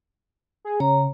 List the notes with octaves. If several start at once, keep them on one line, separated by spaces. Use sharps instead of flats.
G#4
C#3 C#5 A#5